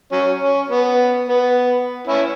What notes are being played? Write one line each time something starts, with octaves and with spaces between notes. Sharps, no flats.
F#3 C#4
C#4
B3
B3
C#4 E4